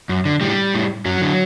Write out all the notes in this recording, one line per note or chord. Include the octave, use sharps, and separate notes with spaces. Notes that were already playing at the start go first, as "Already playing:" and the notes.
F#2
D3
A2 G3
A2
F#2 F#3
D3